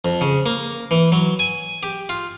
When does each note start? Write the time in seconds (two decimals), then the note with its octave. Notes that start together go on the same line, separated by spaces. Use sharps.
0.05 F2
0.21 C#3
0.46 A#3
0.91 E3
1.12 F#3
1.39 G#5
1.83 G4
2.09 F4